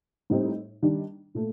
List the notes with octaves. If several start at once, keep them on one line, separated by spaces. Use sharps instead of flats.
A2 G3 C4 D#4
D#3 G3 D4
A#2 A3